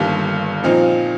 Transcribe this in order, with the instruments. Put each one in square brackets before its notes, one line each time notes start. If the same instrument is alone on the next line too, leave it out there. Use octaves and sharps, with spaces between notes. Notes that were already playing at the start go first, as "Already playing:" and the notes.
Already playing: [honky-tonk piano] G1 G2 D#3 G3 A#3
A#2 F3 C4 D#4